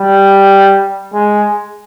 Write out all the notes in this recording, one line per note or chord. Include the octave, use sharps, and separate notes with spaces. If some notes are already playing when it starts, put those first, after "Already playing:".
Already playing: G3
G#3